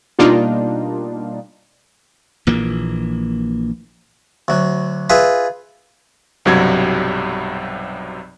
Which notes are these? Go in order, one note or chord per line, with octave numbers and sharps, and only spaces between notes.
B2 G3 A#3 D4 D#4 F4
A#1 A#2 E3 A#3
D2 F#3
F4 G#4 B4 E5
B1 G2 C3 F#3 G3 G#6